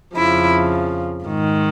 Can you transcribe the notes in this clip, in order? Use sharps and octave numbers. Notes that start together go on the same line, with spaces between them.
F2 C#3 F3 E4
G#2 D#3